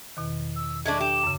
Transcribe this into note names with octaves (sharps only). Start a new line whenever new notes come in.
E2 B2 D#3
E6
G#3 A3 D4 G#6
G4 E7
F#2 C#3